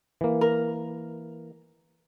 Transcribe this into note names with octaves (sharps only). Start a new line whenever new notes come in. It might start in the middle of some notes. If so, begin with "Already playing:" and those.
E3 A#3
A#4